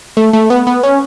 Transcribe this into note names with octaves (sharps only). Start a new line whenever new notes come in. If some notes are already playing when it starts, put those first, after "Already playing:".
A3
A3
B3
B3
C#4